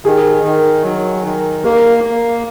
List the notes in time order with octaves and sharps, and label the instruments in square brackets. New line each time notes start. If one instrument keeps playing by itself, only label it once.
[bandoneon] D#3 [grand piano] G#4
[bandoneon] D#3
F#3
D#3
[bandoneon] A#3 [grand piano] A#4
[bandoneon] A#3